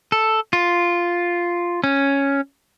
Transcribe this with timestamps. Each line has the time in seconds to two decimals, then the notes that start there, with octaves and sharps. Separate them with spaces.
0.12 A4
0.53 F4
1.84 C#4